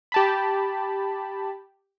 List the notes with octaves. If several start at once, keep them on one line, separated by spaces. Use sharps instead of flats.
G4 A5 B5